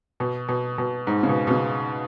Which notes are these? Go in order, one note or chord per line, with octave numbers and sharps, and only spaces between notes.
B2
B2
B2
G#2
C#3
B2
B2
C#3